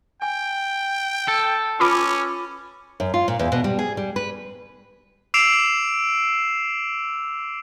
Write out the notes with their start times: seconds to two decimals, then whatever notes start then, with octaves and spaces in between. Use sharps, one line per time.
0.22 G5 G#5
1.28 A4
1.80 C#4 F4 B4 B5 D6
3.00 F#2
3.14 F4
3.28 A#2
3.39 E2
3.52 B2
3.64 G3
3.79 G#4
3.97 G3
4.16 B4
5.34 D6 E6 C7 D7 E7 F7